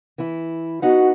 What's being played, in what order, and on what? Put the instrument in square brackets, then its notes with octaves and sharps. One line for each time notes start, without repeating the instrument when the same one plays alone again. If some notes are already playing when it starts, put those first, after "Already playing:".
[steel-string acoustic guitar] E3 E4
[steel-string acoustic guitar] B3 D#4 F#5 [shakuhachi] F#4